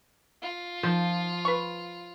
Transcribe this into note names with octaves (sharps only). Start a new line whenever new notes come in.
F4
D#3 F3
B4 C#6